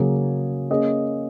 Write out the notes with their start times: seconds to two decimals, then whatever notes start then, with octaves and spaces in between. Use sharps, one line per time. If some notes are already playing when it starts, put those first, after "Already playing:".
Already playing: C#3 F#3 A#3 C#4 G#4
0.70 A#3 C#4 G#4 D#5